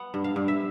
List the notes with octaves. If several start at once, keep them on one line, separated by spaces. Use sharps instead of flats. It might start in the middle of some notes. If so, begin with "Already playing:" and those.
Already playing: B3 F#5
G2
F5
G2
E5